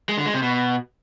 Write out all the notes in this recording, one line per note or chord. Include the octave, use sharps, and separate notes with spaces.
G#3
D3
G#3
C3
B2